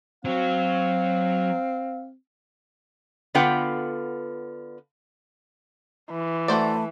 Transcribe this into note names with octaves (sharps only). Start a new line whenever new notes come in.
F#3 C4 F5
D3 B3 F4 B4 F#5 G5
E3
A3 F#4 C5 D5